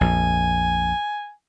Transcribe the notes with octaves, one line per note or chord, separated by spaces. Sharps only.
A#1 F2 G#5